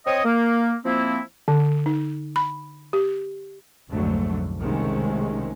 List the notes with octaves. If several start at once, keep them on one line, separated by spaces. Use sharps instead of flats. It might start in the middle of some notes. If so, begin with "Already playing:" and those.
C4 C#5 D#5
A#3
F3 A#3 C4 E4
D3
D#4
B5
G4
B1 F2 G#2 D3 F#3 A3
C2 C3 D#3 G#3 A3 C#4